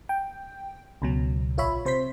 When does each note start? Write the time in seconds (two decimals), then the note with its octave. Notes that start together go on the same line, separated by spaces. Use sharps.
0.09 G5
1.02 C#2 B2 F#3
1.58 A#1 F4 C#5 E5 B5
1.85 C3 C5 C6 B6